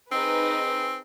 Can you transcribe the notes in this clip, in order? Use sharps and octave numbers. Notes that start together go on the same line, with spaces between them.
C4 D#4 G#4 B4